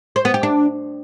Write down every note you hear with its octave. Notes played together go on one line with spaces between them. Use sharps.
C5
B3
G4
D4